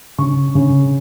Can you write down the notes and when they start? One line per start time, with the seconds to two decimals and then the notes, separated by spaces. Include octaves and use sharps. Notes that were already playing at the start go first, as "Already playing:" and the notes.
0.18 C#3 C#6
0.55 C#3